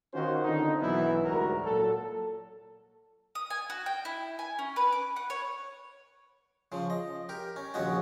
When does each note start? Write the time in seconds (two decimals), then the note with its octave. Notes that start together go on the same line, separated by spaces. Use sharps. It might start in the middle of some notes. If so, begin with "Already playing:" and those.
0.14 D#3 C#4 F4 F#4 C5
0.45 D3 D#3 C4 D#4
0.81 B1 E3 F#3 B3 E4
1.25 D2 G#2 G3 F#4 A#4
1.64 A#2 F#3 A4
3.35 D#6
3.50 G#5
3.70 F#4
3.86 G5
4.05 E4
4.39 G#5
4.59 C#4
4.76 B4
4.92 D6
5.16 F#5
5.30 C#5
6.72 C#3 F3
6.90 D#5
7.29 G4 A#4
7.56 C#4
7.74 A#1 D#2 C#3 C#4 F#4 D#5